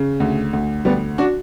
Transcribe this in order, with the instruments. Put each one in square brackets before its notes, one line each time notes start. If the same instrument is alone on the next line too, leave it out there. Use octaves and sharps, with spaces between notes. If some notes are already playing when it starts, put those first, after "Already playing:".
Already playing: [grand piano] C#3
D2
D2
D2 G3 B3
D4 F#4